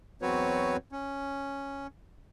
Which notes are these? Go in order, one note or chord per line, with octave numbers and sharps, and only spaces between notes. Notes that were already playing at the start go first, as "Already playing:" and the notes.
E2 F#3 C4 F#4 B4 C#5
C#4